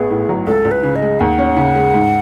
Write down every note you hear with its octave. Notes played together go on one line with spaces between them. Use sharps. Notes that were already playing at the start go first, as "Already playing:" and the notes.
Already playing: A1 B3 G#4
A2
F#3
C#2 A4
C#2
B4
C#3
D#5
G#3
D#2 F#5
C#4
C#3
G#3
G#2